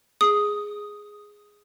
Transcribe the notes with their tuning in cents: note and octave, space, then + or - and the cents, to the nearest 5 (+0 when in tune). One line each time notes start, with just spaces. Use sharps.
G#4 +0 D#6 +0